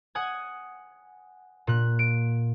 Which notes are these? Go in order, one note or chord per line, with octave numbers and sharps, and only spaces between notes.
F#5 G#5 D#6 G#6
A#2 F#6
D7